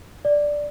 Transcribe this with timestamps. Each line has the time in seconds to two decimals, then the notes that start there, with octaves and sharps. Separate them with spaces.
0.25 D5